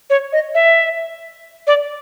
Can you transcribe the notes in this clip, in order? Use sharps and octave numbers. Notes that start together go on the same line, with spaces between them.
C#5
D#5
E5
D5